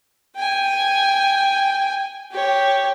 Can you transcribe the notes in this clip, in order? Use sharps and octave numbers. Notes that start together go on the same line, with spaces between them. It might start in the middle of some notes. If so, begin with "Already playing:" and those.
G5 G#5
G4 C#5